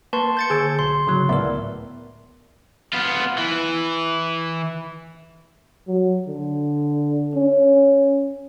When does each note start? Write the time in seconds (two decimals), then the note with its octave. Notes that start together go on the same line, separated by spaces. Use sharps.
0.13 A#3 B4 A5 C6 C#6
0.37 G6 A6 C#7
0.49 D3 G#4 G#5 D6 E6 G#6
0.79 B1 C6
1.07 A2 C#3 F#3
1.29 C#2 A2 B3 A#4 D5 E5
2.93 B3 F4
3.38 E3
5.88 F#3
6.27 D3
7.35 C#4